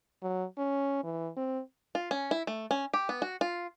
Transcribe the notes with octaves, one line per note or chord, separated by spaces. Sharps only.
F#3
C#4
E3
C4
F4
C#4
E4
A3
C#4
G4
B3
F#4
F4